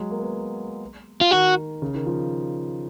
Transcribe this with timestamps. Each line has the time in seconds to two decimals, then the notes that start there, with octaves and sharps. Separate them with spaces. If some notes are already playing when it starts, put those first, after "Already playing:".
Already playing: F#3 G#3
0.11 A#3
0.19 B3
1.21 F4
1.31 D#3 F#4
1.82 C#3
1.94 D#3
2.07 F3